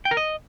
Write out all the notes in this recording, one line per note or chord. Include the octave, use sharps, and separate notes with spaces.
G5
A#4
D#5